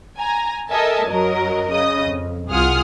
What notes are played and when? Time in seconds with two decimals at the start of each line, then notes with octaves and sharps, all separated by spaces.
0.17 G#5 A#5
0.69 A4 A#4 D#5 E5 G#5 A5
1.08 F#2 F#3 A#4 D#5
1.71 C#3 D#5 D#6
2.05 F2
2.50 C2 F4 G#4 F#5 D#6 F6